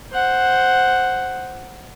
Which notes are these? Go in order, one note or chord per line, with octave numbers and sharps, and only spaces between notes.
C5 F#5